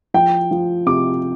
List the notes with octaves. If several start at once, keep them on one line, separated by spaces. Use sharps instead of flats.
F3 G5
F3
C3 D6